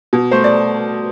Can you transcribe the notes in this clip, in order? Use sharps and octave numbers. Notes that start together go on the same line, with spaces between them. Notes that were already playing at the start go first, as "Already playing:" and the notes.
B2
A3 C5
D5